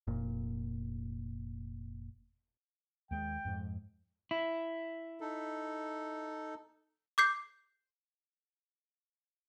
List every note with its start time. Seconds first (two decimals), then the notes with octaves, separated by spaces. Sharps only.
0.07 F1 A#2
3.11 D#2 G#3 G5
3.45 F2 G#2
4.31 E4
5.21 D#4 A4
7.18 D6 G6 C7